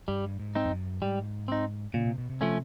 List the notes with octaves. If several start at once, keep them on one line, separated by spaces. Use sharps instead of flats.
G2 G3
G#2
C4 D#4
F2
F#2
G#2 G3
C4 D#4
A#2 C#3
C3
B2
C3
F3 A3 C#4